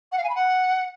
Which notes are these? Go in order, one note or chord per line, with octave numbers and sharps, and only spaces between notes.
F#5
F5
G#5
B5
F#5